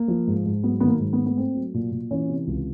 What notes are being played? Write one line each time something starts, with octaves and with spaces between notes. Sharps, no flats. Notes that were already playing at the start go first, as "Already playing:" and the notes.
Already playing: A#3
F3
G#2
G#2
F#3 B3
D#3 B3
A#3
G#2
B3
A#3
B3
A3 C4
F#3
A#2
A#2
E3 C#4
C3
C#2